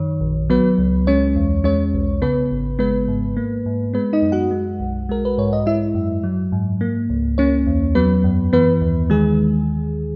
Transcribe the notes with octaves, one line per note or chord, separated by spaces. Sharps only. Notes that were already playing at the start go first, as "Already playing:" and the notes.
Already playing: F#2 D#3 C#5
A#1
F#3 B3 B4
C#2
G#3 C#4 C#5
E2
G#3 C#4 C#5
B1
C#3 B3 B4
G#1
G#3 B3 B4
G#2
A#3
G#2
G#3 B3 B4
D#4 D#5
F#2
F#4 F#5
G#3
B1
G#3 A#4
B4
G#2 C#5
D#5
G#3 E4 E5
F#2
F#3
G#2
A#3
C#2
A#3 C#4 C#5
E2
F#3 B3 B4
F#2
E3 B3 B4
D#2
D#3 G#3 G#4